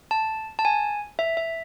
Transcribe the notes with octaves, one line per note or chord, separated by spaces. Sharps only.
A5
A5
G#5
E5
E5